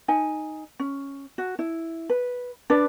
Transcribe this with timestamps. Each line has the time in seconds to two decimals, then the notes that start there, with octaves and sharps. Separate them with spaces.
0.08 D#4 G#5
0.79 C#4
1.38 F#4
1.59 E4
2.09 B4
2.70 D4 B4 D5